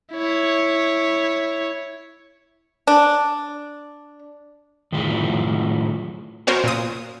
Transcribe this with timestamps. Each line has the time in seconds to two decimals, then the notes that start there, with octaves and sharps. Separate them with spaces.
0.13 E4 C#5
2.87 D4
4.92 A2 D#3 F#3 E4 F4 G#4
6.47 B3 C#4 F#4 A#4 C5 C#5
6.64 A#2 D#6